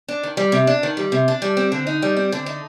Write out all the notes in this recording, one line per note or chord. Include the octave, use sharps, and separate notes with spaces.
D4
D#3
G3
C3
D4
D#3
G3
C3
D4
G3
C4
D3
D#4
G3
C4
D3
D#4